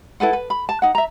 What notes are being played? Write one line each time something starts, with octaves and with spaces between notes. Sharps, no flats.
E4 A4 B4 F#5
B4
B5
A5
D#4 F#5
E5 A#5